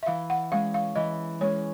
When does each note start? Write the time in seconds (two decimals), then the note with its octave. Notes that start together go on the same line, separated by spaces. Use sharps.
0.03 E5
0.07 E3 F5
0.30 F#5
0.51 G#3 C#4 F5
0.74 F5
0.96 E3 D#5
1.41 G#3 C#4 C#5